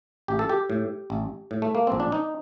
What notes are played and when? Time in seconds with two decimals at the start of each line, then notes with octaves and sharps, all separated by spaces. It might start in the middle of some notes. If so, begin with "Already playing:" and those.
0.28 A1 G4
0.39 A4
0.49 G4
0.70 A2
1.10 A1
1.51 A2
1.62 A3
1.75 A#3
1.87 A#1 C4
2.00 D4
2.12 D#4